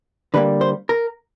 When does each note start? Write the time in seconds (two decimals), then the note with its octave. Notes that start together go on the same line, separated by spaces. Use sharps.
0.34 D3 G3 A#3 B4
0.61 C5
0.89 A#4